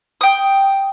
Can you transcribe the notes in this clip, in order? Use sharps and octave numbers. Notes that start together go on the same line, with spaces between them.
G5 D#6